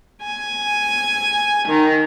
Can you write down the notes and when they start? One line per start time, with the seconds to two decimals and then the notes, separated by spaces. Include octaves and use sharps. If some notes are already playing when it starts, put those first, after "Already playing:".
0.22 G#5
1.68 D#3